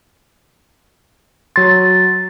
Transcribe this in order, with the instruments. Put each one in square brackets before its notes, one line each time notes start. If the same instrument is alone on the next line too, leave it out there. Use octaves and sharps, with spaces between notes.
[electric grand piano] F#3 C6 [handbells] A6